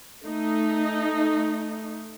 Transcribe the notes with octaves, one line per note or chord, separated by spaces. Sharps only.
A3 D#4